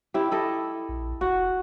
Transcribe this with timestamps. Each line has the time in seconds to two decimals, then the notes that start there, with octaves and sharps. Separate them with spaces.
0.14 E4 G4
0.31 E4 A4 D#5
0.89 A#1
1.21 F1 F#4